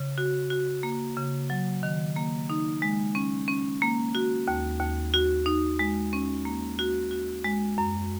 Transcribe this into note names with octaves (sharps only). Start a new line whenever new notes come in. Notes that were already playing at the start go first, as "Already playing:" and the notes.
Already playing: C#3
F#4
F#4
A#3
C#3
F#3
D#3
A#3
D#4
G#3
C#4
C#4
A#3
F#4
D#2
D#2
F#4
D#4
G#3
C#4
A#3
F#4
F#4
G#3
F#2